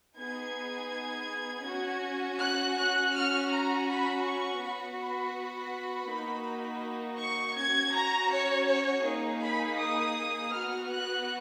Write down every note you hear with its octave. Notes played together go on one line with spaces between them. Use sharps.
B3 D#4 G#4 G#6
C#4 F#4
F#6
F#6
C#4 F#4 F6
A#5
B5
C#6
B3 F#4 B5
B5
A#3 D#4 F#4
C#6
C#4 F#4 G#6
A#5
C#5
C#5
A#3 D#4 G#4
B5
D#6
B3 F#4 F6
F#6